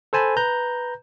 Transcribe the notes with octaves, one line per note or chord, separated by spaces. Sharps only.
A4 C5 G#5 A5 B5
B4 A#5 G6